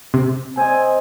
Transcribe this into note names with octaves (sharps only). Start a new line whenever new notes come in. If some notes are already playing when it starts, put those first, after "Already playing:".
C3
C4 D#5 G#5